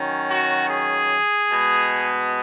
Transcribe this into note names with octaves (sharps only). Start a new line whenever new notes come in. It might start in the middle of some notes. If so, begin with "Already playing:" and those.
Already playing: D#3 F#3 C#4
F#4
G#4
B2 G#3 B3